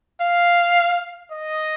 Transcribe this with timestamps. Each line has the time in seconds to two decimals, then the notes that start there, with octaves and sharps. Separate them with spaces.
0.21 F5
1.31 D#5